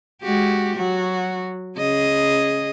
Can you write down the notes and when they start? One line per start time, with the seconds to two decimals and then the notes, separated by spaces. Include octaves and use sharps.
0.22 G#3 F#4 G4
0.76 F#3 F#4
1.77 C#3 G#4 D#5